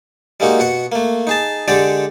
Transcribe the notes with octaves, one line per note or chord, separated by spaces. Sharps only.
G3 G#3 A#3 D#4 F#4
B2 F#4 F#5
A3 A#3
D#4 G#4 A5
D3 G#3 G4 A4 D5